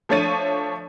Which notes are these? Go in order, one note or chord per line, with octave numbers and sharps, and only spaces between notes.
F3 A3 D4 C#5 A6 D#7